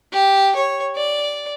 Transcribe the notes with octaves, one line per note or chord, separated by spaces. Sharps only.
G4
C#5
D5